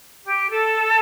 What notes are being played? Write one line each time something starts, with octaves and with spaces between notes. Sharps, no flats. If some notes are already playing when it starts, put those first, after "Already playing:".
G4
A4